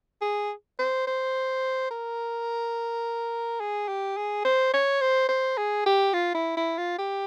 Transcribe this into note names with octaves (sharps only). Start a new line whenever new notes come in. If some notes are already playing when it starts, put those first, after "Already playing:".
G#4
C5
C5
A#4
G#4
G4
G#4
C5
C#5
C5
C5
G#4
G4
F4
E4
E4
F4
G4